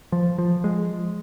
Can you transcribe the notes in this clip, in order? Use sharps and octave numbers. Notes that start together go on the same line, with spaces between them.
F3
F3
G#3